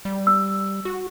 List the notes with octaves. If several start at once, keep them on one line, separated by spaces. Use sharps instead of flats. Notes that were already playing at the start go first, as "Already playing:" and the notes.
G3
E6
F#4